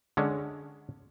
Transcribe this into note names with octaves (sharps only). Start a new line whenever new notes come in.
D3 G#3 C#4